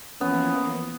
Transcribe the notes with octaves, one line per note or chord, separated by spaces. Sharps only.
E3 F3 A#3 B3 C#4